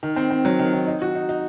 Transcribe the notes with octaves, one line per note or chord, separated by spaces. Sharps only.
D#3
C4
C4
F#3
D#3
D#3
D#4
F#4
D#4
D#4